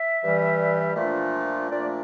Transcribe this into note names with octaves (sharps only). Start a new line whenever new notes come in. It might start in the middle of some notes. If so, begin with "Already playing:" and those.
Already playing: E5
G2 E3 G3
A#2 F3 A3 D4
A#2 F3 A3 D4 D5